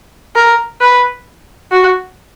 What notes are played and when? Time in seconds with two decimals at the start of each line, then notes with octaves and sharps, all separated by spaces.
0.36 A#4
0.81 B4
1.72 F#4